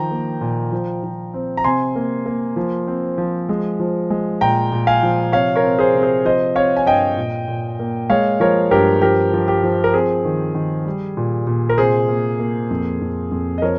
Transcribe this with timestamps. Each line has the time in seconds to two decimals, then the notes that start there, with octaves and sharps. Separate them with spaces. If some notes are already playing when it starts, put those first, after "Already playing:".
Already playing: D#3 F3 G5 A#5
0.11 A#3
0.41 A#2
0.72 F3
1.03 F3
1.34 C4
1.57 A#5
1.64 C3 G#5 C6
1.96 A#3
2.26 A#3
2.56 F3
2.87 C4
3.18 F3
3.49 G#3
3.80 F3
4.10 G#3
4.41 A#2 G5 A#5
4.72 A#2
4.87 F5 G#5
5.03 F3
5.32 C3 C#5 F5
5.56 A#4 C#5
5.63 C4
5.79 G#4 C5
5.94 C3
6.02 G#4 C5
6.25 F3 C5 D#5
6.55 C4 C#5 F5
6.77 G#5
6.86 G2 D#5 G5
7.17 A#2
7.48 A#2
7.79 A#3
8.10 G#3 C#5 F5
8.40 F3 A#4 C#5
8.71 G2 G4 A#4
9.02 F3 G4 A#4
9.33 F3
9.48 G4
9.63 F3
9.84 A#4
9.93 C4 G#4
10.25 D#3
10.55 D#3
10.85 G3
11.17 A#2
11.47 A#2
11.69 A#4
11.78 C3 G#4 C5
12.09 A#3
12.40 A#3
12.70 F2
13.01 F2
13.31 F2
13.58 D#5
13.62 F3 A#4 C#5